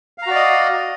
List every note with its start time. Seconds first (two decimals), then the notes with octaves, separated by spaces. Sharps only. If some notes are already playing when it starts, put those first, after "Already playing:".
0.18 F5
0.22 A#5
0.27 F#4
0.31 D5
0.35 D#5